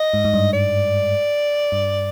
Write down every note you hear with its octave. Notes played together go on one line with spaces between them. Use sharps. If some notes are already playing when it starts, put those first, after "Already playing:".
Already playing: D#5
G#2
G#2
G2
D5
G2